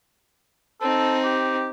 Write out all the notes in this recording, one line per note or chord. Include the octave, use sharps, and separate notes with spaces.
C4 D#4 A4
G4